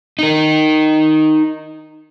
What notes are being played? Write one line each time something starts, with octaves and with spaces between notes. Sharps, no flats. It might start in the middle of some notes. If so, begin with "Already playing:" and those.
D#4 A#4